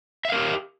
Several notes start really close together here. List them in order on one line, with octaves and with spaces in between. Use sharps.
E5 F5 A#4 G4